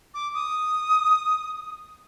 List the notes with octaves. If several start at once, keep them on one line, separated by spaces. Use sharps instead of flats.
D6
D#6